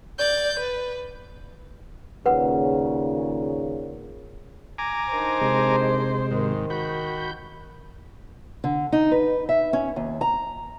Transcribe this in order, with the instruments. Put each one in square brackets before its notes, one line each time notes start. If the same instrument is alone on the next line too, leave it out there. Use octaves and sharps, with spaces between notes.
[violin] D5 G6
B4
[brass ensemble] D#2 A#2 C#3 [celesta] B4 F#5
[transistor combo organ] G#5 A#5 D6
[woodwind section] D#3 D4 D#4 [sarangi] C5
[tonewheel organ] C3 G#3
[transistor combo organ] G#2 [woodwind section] D#3
[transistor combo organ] F#4 B5 [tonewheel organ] G6
[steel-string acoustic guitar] D3
D#4
B4
E5
C#4
D#2
A#5